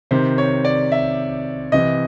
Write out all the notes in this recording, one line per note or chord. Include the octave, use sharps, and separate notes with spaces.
C3 D#3 C5
C#5
D5
E5
C3 E3 D#5